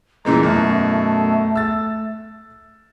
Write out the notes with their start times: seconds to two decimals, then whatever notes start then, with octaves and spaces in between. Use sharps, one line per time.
0.25 A#2 E3 G#3 A#5
0.43 F#2 B2 A3
1.56 E6 A6